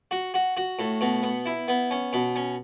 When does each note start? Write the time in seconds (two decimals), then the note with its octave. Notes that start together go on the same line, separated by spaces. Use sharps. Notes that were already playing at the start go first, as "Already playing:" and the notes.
0.11 F#4
0.34 F#4
0.57 F#4
0.79 A2
1.01 B2
1.23 B3
1.46 E4
1.68 B3
1.91 C#4
2.13 B2
2.36 C#4